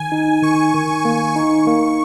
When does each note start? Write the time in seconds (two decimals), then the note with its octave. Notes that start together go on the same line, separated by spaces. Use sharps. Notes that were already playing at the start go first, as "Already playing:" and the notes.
Already playing: D#3 G#5
0.12 D#4
0.42 D#3 C#6
0.74 D#3
1.05 A#3
1.36 D#4 C#6
1.67 A#3